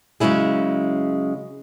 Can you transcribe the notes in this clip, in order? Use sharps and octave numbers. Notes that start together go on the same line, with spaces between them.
C#3 F#3 G#3 C#4 E4 G#4